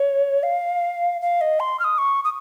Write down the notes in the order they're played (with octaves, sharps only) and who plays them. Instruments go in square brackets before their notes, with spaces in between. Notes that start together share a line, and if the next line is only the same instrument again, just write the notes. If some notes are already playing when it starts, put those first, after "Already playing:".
Already playing: [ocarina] C#5
F5
F5
D#5
C6
F6
D#6
C#6
D#6